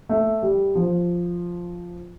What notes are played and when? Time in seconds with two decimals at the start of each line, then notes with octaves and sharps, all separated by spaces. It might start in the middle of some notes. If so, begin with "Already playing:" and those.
0.09 A3
0.42 G3
0.75 F3